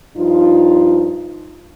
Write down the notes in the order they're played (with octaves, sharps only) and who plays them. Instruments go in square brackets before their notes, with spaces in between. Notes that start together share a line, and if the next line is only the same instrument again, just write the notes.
[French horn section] G2 F3 D#4 F4